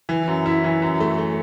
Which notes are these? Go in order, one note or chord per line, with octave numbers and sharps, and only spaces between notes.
E3
F#2
E4
E3
F#2
A3
A3